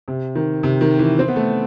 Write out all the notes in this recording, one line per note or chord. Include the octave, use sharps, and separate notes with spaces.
C3
D#3
C3
D#3
E3
C4
B3
A3